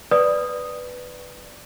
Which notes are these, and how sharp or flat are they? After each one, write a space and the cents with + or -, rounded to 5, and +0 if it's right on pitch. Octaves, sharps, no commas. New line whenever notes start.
B4 +10 D5 +0 D#6 +0